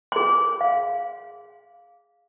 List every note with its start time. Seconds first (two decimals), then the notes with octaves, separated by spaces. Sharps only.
0.12 G#4 C6
0.61 F5